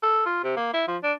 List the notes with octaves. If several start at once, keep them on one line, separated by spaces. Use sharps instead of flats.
A4
F4
C3
A#3
E4
F3
D4